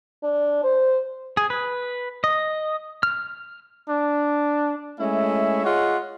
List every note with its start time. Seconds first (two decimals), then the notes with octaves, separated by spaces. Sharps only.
0.23 D4
0.63 C5
1.37 G#4
1.50 B4
2.24 D#5
3.03 F6
3.89 D4
4.99 G#3 A3 C#4 E4 E5
5.65 F4 G#4 C#5 D#5 F#5